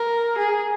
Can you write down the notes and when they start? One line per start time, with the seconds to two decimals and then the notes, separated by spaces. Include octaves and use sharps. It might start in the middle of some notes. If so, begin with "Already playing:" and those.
Already playing: A#4
0.38 G#4